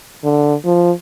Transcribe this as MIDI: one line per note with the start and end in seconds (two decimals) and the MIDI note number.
0.24 0.55 50
0.66 0.91 53